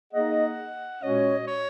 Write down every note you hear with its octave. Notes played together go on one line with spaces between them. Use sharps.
A#3 D#4 G#4 D#5 F#5
A#2 G#3 C#4 F#4 C#5 D#5
C#5